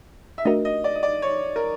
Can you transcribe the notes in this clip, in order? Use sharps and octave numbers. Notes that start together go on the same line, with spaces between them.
E5
A3 D4 F#4 A#4 D#5
D#5
D5
D#5
D5
C#5
A#4